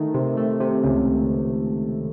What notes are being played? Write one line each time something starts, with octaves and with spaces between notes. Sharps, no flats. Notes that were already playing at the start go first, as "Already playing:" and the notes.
Already playing: D#3 A3
C3
A3
C3
C#2